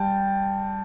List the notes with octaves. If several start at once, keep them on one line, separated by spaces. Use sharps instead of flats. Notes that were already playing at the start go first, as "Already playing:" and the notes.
Already playing: G3 G5 A5